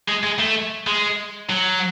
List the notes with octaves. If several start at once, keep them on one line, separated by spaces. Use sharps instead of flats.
G#3
G#3
A3
G#3
F#3